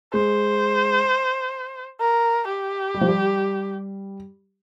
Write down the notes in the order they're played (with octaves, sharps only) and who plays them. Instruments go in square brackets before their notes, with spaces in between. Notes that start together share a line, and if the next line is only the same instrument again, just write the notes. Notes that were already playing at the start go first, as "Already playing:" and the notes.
[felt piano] G#3 [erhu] C5
[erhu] A#4
G4
[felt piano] G3
F3
G3